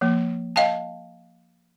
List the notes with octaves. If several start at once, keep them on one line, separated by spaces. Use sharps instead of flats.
F3 A#3
D#5 F5 G5 A5